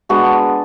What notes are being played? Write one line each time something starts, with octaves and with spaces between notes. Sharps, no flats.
G#3 B3 D4 F#4